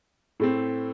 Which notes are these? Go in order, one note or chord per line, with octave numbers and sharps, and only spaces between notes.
A2 A3 C4